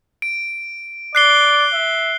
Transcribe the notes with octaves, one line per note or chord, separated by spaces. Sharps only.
D7
D5 F#6 C7 G7
E5